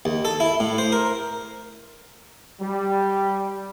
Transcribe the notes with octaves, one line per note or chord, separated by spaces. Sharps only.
D#2
A4
E4
A2
C5
A#4
G3